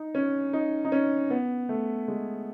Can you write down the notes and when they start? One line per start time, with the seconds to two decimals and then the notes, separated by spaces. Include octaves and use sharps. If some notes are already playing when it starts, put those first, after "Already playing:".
Already playing: D#4
0.15 C#4
0.53 D#4
0.85 D#4
0.92 C#4
1.30 B3
1.69 A3
2.08 G#3